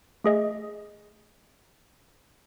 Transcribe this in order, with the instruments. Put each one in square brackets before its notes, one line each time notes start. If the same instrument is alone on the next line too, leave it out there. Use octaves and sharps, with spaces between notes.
[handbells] A3 G#4 D#5 E5